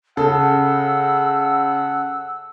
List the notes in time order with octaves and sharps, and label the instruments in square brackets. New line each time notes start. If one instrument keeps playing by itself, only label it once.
[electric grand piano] C#3 [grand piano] A4 [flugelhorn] F#5 [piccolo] E6